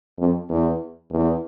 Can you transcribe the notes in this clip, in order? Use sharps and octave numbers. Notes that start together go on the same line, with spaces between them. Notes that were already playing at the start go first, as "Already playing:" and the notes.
F2
E2
E2